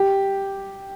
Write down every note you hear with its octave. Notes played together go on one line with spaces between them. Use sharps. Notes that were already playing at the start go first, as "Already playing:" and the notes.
Already playing: G4